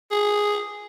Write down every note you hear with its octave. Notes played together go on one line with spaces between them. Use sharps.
G#4